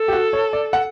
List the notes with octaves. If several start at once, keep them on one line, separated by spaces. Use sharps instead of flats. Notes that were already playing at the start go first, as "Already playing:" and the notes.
Already playing: A4
G4
F#4
C#5
D5
F#5